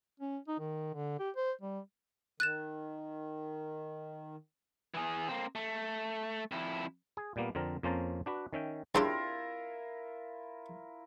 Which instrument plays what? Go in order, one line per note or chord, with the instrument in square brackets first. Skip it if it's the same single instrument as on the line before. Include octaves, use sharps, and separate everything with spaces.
[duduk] C#4
D#4
D#3
D3
G4
C5
G3
[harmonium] D#3 [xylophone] F#6 A6 E7
[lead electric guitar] E3 G#4
A#3 C4
A3
F2 E4
[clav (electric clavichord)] G#4
A#2 G3 A#3 B3
F2 D3 C4 A#4
F2 A#3 C#4 C5 A5 A#5
D4 F#4 B4
D#3 C#4 E5 G5
[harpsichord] C#3 [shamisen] C4 D4 G4 [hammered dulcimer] E4 F4 A#4